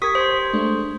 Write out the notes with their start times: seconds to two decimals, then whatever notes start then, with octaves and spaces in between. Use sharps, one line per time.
0.02 G4 A#4 C#6 D#6 G#6 B6
0.15 C5 C6
0.53 G#3 A3 D4